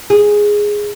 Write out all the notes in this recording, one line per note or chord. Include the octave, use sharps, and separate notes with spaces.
G#4